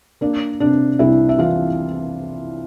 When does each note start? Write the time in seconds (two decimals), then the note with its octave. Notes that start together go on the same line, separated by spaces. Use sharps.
0.21 A#3 D4 D5
0.60 C3 D4 D5
0.99 C2 E4 E5
1.29 E5
1.38 E3 F4 F5